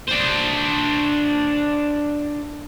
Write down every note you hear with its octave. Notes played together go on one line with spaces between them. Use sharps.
D4 C5